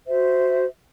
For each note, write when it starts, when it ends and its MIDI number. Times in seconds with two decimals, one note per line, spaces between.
0.07 0.64 66
0.07 0.64 72
0.07 0.64 76